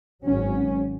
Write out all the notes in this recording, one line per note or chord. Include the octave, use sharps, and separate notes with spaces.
G#1 F#3 C#4